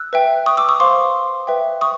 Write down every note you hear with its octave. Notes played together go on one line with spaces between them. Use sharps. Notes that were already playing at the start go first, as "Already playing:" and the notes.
Already playing: E6 F#6
B4 E5 G5
C#6 D#6
D6 E6
C#6 D#6
C5 F5 C6 D6
B4 E5 G5
C#6 D#6